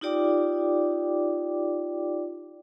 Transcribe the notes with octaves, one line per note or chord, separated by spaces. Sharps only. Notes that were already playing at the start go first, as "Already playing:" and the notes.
D#4 F4 G4 D5 G5 D6